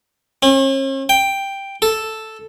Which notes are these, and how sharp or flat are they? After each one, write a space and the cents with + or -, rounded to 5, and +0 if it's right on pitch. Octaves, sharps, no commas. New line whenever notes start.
C#4 -45
G5 +5
A4 +0